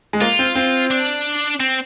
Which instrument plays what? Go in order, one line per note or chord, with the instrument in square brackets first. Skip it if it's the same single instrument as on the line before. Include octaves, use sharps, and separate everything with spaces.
[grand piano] G#3
[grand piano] A#3 [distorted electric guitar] F4
[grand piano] C4
C4
[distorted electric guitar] D4
C4